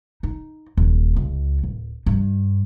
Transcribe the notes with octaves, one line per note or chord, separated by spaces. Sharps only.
D#4
D#1
C#2
D1
G2